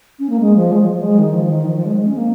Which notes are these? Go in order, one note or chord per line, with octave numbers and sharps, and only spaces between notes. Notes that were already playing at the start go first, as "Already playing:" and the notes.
C#4
A#3
G#3
F3
G#3
F3
F3
G#3
D#3
F3
D#3
F3
F3
G#3
G#3
C#4
A#3